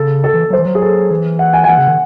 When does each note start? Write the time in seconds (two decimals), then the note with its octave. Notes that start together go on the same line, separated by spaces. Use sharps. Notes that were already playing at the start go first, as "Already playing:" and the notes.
Already playing: C#3 A4
0.24 A4
0.34 E3
0.50 F#3
0.53 C5
0.59 E3
0.65 F#3
0.75 G#4
0.82 A4
1.11 E3
1.39 F#5
1.53 G#5
1.64 G#5
1.68 E3 F#5
1.78 C#3
1.87 D#3